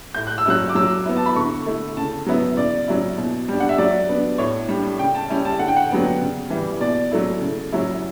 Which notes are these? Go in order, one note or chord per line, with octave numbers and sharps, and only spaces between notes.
A2 G6
F#6
E6
F#3 C#4 E4 F#6
D6
F#3 E6
B3 E4
A5
B5
D3 C#6
A3 E4
C#3 A5
F#3 B3 E4
C#3 D5
F#3 C#4 E4
B2
G3 D4
F#5
E5
F#3 D5
B3 D4
A2 C#5
G3 D4
C#3 G5
A5
G3 C#4 E4
A5
D3 F#5
G5
F#5
F#3 B3 D4
C#3
E3 G3
B2 D5
F#3 A3 E4
C#3
F#3 C#4 E4